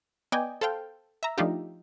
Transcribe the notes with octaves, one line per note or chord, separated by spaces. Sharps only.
B3 D5 D#5 G5 G#5
A4 C5 F5 G5
E5 A#5
F3 A3 D4 D#4 F4 G4